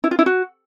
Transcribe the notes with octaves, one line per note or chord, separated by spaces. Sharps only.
E4
F4
E4
F#4